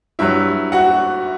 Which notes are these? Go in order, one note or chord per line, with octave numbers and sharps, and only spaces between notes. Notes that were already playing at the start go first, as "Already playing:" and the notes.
G2 F#3 E4 E5
F#4 F#5